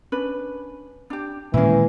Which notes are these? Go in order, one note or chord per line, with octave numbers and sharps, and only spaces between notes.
C#4 D4 B4
D4 G4
A#2 D#3 E3 G#3 C#4 E4